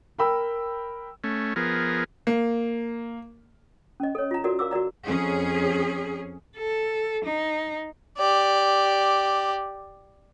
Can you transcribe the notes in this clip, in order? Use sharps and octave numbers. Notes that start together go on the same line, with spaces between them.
A#4 G5 B5 E6
A3 C#4
F3 B3 G#4 A#4
A#3
C#4 D#5
A4 C#5
F4 A#5
F#4 A4 A#4 D5
A#4 F5 D6 E6
F#4 A#4 D5 A#5
F2 C#4 G#4
A4
D#4
G4 D5